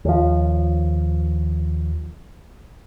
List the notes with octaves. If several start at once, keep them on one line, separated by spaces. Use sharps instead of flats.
D#2 F3